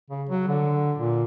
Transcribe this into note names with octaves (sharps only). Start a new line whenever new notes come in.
C#3
F#3
D3
A#2